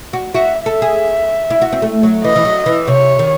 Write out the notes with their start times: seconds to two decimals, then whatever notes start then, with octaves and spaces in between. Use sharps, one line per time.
0.13 F#4
0.34 F#4 E5
0.66 A4 E5
0.82 G#4
1.50 E4
1.62 F#4
1.72 C4
1.82 A3
2.03 F#3
2.24 E3 D#5
2.36 E3
2.45 F#3
2.66 E3
2.87 C3 C#5
3.19 D#3